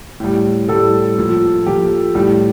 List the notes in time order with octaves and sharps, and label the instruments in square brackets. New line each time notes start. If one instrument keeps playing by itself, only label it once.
[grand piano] A2 G3
A2 G3 A4
A#2 F3
A#2 F3 G4
A2 G3